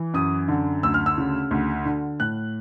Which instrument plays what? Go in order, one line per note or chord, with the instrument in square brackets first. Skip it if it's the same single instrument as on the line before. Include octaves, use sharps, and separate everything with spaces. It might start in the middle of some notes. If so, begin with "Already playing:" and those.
Already playing: [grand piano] E3
F#2 D#6
D3
D2 E6
F6
E6
C#3
D2
D3
A2 F#6